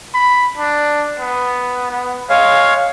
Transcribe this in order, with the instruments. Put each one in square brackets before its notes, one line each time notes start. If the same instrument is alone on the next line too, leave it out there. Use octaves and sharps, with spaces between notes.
[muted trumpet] B5
D4
B3
B3
[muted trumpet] G#3 [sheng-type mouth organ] C#5 F5